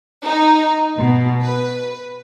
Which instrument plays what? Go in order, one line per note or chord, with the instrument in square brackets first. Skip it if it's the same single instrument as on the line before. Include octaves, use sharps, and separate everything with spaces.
[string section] D#4
B2
B4